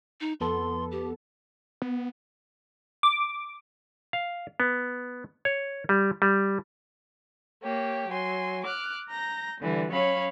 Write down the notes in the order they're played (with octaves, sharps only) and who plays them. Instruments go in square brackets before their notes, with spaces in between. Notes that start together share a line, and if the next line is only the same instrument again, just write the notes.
[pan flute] D#4
[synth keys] F2 B3 A4 [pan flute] C6
[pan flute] G4
[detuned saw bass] B3
[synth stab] D6
[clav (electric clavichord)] F5
B3
C#5
G3
G3
[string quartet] A#3 G4 C#5
F#3 G#5 C6
D6 F6 F#6
A#5 G6 A#6
D3 E3 G3
F#3 C#4 C#5 F5 B5